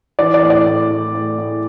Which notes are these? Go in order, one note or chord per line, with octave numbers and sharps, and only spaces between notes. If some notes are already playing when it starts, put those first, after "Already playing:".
E3 D5
D5
A2
D5
A2
A2
A2
A2